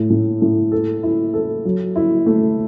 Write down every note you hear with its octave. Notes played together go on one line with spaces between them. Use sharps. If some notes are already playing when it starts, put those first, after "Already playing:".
Already playing: A2 A3
A2
A2
A4
E4
A4
F#3
E4
A3